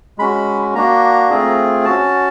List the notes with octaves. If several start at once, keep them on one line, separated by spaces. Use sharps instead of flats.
G#3 C#4 F#4 B5
A#3 D4 F#4 A#5
A3 C4 F4 G#4
C#4 F#4 A5